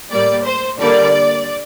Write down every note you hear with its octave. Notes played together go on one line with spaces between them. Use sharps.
A2 G3 A#3 D5
C5
D3 G3 A#3 D5